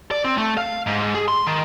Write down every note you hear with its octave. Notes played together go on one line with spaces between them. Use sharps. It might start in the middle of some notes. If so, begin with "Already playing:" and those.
D5
C4
A3
F5
G#2
G#4
C6
D#3